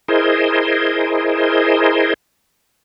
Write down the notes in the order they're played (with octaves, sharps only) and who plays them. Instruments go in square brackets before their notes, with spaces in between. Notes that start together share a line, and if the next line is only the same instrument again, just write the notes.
[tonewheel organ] E4 G#4 A#4 C5 D#5